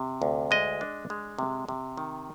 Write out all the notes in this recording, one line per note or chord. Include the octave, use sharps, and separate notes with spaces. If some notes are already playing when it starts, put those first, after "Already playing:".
Already playing: C3
D2
G#3 D#5
D4
G#3
C3
C3
D#3